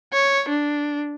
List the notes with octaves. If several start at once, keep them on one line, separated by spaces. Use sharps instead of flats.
C#5
D4